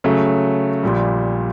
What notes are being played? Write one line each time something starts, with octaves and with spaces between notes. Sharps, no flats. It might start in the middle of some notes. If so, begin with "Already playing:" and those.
C#3 F#3 A3
A#1 A#2 G3